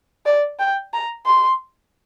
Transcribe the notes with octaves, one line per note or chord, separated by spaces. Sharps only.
D5
G5
A#5
C6